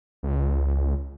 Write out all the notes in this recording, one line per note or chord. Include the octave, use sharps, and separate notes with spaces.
C#2